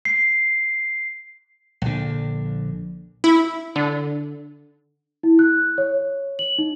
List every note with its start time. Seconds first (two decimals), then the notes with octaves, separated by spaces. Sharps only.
0.05 C7
1.82 A#1 D3
3.24 E4
3.76 D3
5.23 E4
5.39 F#6
5.78 C#5
6.39 F#7
6.58 D#4